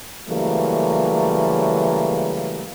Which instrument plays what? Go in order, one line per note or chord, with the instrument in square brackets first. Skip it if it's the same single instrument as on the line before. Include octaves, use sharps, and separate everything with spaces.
[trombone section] C#3 E3 F#3 G3 A3 A#3